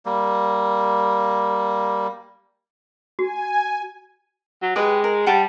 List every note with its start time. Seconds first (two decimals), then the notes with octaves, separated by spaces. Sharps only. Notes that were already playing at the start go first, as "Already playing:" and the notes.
0.05 G3 A#3
3.19 F#4 G#5
4.62 F#3
4.76 G#3 G4 B4 D#5
5.04 A#4
5.26 G3 F#5 G5 A5